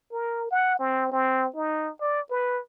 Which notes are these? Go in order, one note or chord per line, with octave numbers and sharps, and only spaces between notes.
A#4
F#5
C4
C4
D#4
D5
B4